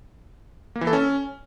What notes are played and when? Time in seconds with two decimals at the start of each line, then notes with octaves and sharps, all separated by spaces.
0.76 A#3
0.81 E3
0.87 A4
0.93 C#4